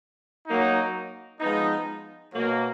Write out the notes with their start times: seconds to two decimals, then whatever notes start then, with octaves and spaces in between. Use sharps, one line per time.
0.46 F#3 A#3 D#4
1.39 F3 G#3 B3 D#4
2.33 B2 F#3 A#3